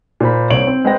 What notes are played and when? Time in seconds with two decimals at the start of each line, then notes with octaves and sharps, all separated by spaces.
0.20 A#2 C5 B5
0.50 C2 C5 C#5 D7 F#7
0.67 C4
0.84 G#3 B4 C5 G5 A#6